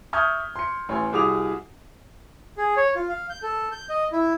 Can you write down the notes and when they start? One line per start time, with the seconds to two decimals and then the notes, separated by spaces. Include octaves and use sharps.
0.13 E5 C#6 D#6 F6 G6 G#6
0.56 C6 C#7
0.89 A1 C#5 G#5 C6
1.13 C2 F#4 G#4 D6 D#6 F7
2.57 G#4
2.77 C#5
2.96 F4
3.09 F5
3.30 G6
3.43 A4
3.72 G6
3.89 D#5
4.12 E4